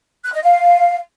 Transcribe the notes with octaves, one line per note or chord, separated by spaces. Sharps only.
F#6
D#5
F5